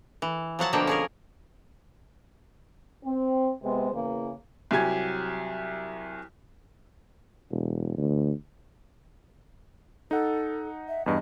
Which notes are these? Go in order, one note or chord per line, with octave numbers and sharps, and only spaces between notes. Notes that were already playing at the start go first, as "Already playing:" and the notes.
E3
F3 F#3 F#5 A5
B2 D3 F3 A#3 G5 A5
C#4 G#4 A#4
C4
C3 G#3 B3 C5
E2 C#3 E3 A#3
C2 F#3 G4 G#5 G#6
E1
D2
D#4 A4 F#5
E5
E2 G2 D#5